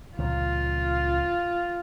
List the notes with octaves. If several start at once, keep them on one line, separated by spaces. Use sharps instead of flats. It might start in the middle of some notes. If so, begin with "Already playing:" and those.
C#2 A#2 F3 F4